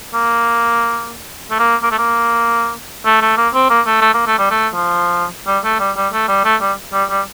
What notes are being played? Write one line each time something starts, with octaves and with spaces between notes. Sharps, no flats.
A#3
A3
A#3
A#3
A3
A#3
A3
A3
A#3
C4
A#3
A3
A3
A#3
A3
G3
A3
F3
G3
A3
G3
G3
A3
G3
A3
G3
G3
G3